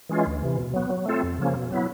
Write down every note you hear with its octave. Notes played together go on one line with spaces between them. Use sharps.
E3 G#3 C#4 F4
D2
C3 E3
B2
F#3 B3
F#3
A3 C4 F4 A4
F2
C#3 F3 A#3 C#4
B2
F#3 B3 E4